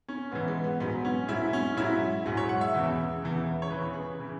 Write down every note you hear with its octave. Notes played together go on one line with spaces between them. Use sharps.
C#4
G#2 E3 B3
G#3
B3
G#2 F#3 B3
C#4
G#2 F#3 E4
C#4
G#2 F#3 E4
G#2 F#3 G#4
C#5
F#5
E5
E2 C#3 E3
E2 C#3 E3
C#5
E2 C#3 E3 B4
G#4
B4
C#3 E3